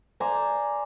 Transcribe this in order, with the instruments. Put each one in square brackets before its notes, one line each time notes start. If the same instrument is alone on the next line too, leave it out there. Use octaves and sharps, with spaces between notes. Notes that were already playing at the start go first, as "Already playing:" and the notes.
[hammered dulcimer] C5 D5 G#5 A#5